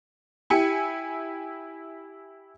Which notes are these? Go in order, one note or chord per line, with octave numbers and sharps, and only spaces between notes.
E4 G4 G#5 C#7